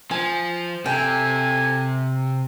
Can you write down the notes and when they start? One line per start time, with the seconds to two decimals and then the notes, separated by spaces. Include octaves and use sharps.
0.11 F3 G#5
0.86 C3 A4 G5 G#5